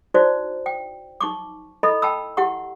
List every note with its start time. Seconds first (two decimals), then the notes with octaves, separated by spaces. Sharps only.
0.14 D#4 E4 F#4 C5 D5
0.66 G5
1.21 D#4 C#6 D6
1.83 E4 A4 D#5 B5
2.02 G5 A5 B5 E6
2.37 E4 G4 F#5 C#6